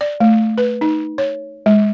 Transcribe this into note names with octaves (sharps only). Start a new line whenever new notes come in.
D5
A3
B4
D#4
C#5
G#3